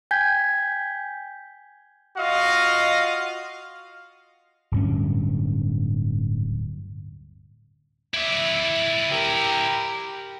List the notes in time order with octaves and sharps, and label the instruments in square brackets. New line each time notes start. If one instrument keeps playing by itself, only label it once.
[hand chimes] G5 G#5 G6 G#6 B6
[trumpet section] F4 F#4 D#5 F5
[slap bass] D1 G2 C#4
[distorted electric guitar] E4 D5 [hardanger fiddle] E5
[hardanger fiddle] G4 A#4